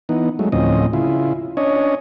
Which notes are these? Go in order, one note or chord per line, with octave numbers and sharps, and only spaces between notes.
E3 B3 D#4
F#3 G#3 A3
D2 A2 F3 C4 C#4 D#5
C#3 E4 F4
C#4 D4 C#5 D#5